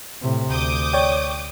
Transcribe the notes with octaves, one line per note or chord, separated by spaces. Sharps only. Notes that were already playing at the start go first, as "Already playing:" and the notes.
A2 C3
D2 D6 D#6 G6
C#5 D5 G5